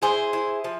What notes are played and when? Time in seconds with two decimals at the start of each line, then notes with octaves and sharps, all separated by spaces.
0.02 E4 G#4 C5
0.33 E4
0.64 F3